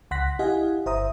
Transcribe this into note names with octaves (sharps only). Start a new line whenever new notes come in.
C#2 F#5 C6 F#6 A#6 B6
E4 G4 D#5 F5 F#5 G#5
G1 C5 E5 A#5 D#6